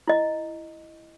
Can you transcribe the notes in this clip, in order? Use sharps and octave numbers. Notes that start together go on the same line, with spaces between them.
E4 D#5